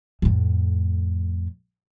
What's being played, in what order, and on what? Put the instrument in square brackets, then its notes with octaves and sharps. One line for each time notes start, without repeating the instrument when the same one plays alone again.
[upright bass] F2 A2